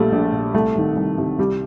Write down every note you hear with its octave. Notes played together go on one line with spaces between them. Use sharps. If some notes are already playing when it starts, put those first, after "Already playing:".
Already playing: A#1 A#2 G3 A3
A#1
A#2
C2 A3
C3 D#3
C2
C3 D#3
C2 G3